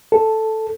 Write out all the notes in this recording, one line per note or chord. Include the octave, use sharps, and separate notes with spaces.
A4